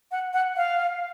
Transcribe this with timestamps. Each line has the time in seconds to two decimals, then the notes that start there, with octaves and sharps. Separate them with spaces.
0.11 F#5
0.33 F#5
0.57 F5